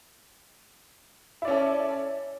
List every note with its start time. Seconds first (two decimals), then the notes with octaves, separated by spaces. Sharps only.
1.42 E4
1.45 D5
1.48 C#4
1.51 A4